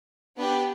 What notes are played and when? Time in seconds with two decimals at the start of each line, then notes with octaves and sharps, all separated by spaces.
0.38 B3 D4 G4 B4